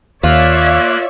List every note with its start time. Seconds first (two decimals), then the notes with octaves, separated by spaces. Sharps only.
0.23 D#2 A#3 F4 C#5 D5 E5 F#6